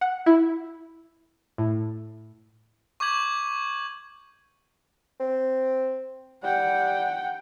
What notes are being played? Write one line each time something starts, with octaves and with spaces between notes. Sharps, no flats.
F#5
E4
A2
C#6 D6 G6 G#6 F#7
C4
G3 F#5 G5